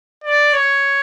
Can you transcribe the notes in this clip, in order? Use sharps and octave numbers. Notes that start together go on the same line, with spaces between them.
D5
C#5